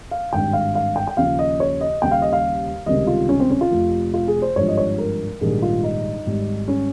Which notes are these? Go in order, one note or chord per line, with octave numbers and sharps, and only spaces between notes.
F5
G#1 G2 D#3 G5
F5
F5
G5
G5
D#2 C#3 F3 F5
D#5
C#5
D#5
D#2 C#3 G3 G5
F5
D#5
F5
C#2 C3 D#3 G3 D#5
F4
C#4
C4
C#4
F4
F1 F2 C3 F3
F4
G#4
C5
G#1 G2 F3 C#5
D#5
C#5
A#4
A#1 G#2 D#3 G3 G#4
F4
D#4
G#1 G#2 G3
C#4